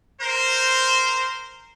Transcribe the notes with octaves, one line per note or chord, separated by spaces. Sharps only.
A#4 C5